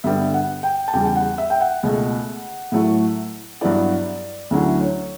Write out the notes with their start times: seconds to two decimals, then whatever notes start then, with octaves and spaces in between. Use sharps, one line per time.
0.04 G2 D3 G3 B3 E5
0.34 F#5
0.63 G5
0.88 A5
0.93 E2 C#3 G3 G5
1.05 G5
1.16 F#5
1.38 E5
1.50 G5
1.60 F#5
1.83 C#2 B2 A3
2.72 A2 F#3 A3 E4
3.61 G2 F#3 B3 E4 D5
4.51 D2 D3 F#3 C#4 E4
4.81 C#5